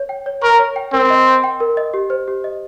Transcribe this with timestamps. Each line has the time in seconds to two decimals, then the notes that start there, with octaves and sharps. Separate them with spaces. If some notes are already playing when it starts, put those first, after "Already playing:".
Already playing: C#5
0.09 G5
0.26 C#5
0.42 A#4 C#6
0.59 C#5
0.76 G5
0.93 C4 A#4
1.10 D#5
1.27 C6
1.44 G5
1.60 A#4
1.77 D#5
1.94 G4
2.10 C5
2.28 G4
2.44 D#5